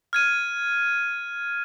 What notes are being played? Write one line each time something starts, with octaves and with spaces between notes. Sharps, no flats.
F6 G#6 D#7